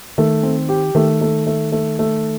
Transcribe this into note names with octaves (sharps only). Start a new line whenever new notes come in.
D#3 A3
C4
G4
D#3 A3
A3
A3
A3
A3